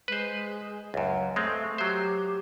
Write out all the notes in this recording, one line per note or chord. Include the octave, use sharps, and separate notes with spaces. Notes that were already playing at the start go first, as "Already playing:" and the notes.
G#3 B4 C5
C#2 F#2
G#3 A3 C4
F#3 G4 C5